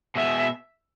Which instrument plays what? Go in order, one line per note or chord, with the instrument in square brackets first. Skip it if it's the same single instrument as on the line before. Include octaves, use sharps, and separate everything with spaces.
[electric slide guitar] B2 G#3 B3 [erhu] E5